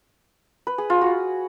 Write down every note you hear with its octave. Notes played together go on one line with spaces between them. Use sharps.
B4
G#4
F4
F#4